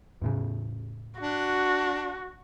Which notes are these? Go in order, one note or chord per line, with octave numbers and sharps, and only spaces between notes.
E2 A2 C#3
D4 F#4